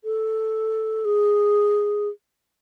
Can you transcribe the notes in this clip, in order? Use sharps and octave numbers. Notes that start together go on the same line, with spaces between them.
A4
G#4